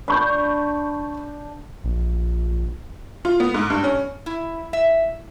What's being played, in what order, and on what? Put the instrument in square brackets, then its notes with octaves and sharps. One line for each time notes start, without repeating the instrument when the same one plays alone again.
[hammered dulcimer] D4 [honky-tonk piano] B5 C#6 G6
[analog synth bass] A#1
[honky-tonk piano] F4
B3
G#2
G2
C#4
[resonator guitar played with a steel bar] E4
E5